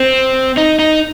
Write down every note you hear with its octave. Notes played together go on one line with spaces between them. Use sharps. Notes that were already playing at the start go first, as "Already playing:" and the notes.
Already playing: C4
D#4
D#4